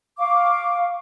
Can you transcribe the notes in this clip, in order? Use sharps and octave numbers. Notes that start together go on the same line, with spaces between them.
F5 C#6 D6